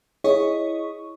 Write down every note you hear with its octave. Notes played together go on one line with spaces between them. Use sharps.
E4 G#4 C#5 D#5 C#6